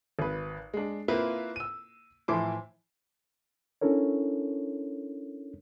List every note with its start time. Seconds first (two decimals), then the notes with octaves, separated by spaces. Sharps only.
0.19 G#1 B4
0.74 G#3 D4
1.08 A#3 C4 E4 F4 A#4 B4
1.56 E6 D#7
2.28 A2 E3 F3 E4 C6 D6
3.81 C#4 D4 E4 A4 A#4 C#5